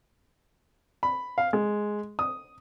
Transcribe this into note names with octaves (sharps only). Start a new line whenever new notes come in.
B5
F5
G#3
D#6